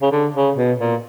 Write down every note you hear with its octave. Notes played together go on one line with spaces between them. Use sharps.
C#3
D3
C#3
B2
A#2